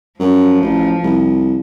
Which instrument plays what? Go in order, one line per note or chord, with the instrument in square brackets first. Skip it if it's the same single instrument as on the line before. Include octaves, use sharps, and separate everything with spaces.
[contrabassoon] F#2 [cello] F3
[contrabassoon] A1
C2